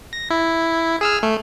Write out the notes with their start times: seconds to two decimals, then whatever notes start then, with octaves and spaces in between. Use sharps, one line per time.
0.13 A#6
0.30 E4
1.01 G#4 E6 F6
1.23 A3